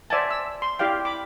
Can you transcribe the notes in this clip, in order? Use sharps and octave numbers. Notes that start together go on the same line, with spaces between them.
C5 D5 E5 F#5 G#5 A5
E6
C6
E4 G4 D5 F5 G5
B5 D6